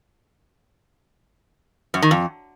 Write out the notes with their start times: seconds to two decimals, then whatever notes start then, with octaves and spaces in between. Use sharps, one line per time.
1.94 F#2
2.02 D#3
2.11 F2